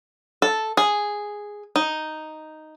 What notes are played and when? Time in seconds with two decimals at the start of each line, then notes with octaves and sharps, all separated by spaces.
0.42 A4
0.77 G#4
1.76 D#4